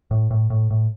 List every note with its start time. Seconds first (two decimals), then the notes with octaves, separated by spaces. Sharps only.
0.11 A2
0.30 A2
0.50 A2
0.70 A2